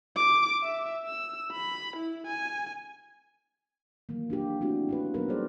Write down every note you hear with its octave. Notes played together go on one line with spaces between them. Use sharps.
D6
E5
E6
B5
E4
G#5
D#3 E3 F#3 A#3
D4 F4 G4
A3 C4 D4 E4 F#4 G4
C#4 F4 B4
F#3 A#3 B3 D#4 A#4 B4
G3 C#4 G#4 C5 D5